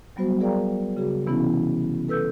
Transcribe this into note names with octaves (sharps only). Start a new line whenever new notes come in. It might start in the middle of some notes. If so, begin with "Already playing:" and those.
F#3 G3 B3 F#4 C5
G#4 A#4 D5 F5 G5 A#5
C#3 F#4 G#4
C3 E3 B3 C#4 E4
A4 B4 E6 G6